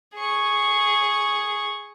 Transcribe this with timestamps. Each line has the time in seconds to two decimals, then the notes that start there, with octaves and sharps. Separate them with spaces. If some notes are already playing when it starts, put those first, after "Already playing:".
0.15 G#4 C#6